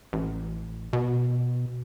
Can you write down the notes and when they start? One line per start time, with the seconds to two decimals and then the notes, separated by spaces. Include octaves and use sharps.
0.13 A1
0.93 B2